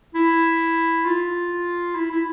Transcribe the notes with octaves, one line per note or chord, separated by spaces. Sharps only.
E4
F4
E4
E4